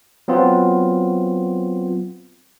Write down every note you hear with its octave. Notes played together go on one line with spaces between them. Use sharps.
F#3 B3 C4 F4